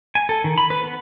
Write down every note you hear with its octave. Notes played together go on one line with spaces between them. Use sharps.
G#5
A4
D#3
B5
B4
B3